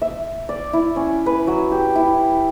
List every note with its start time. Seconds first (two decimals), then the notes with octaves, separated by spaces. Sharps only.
0.02 E5
0.49 D5
0.73 E4
0.96 C#4
1.26 B4
1.47 F#3
1.72 G4
1.96 E4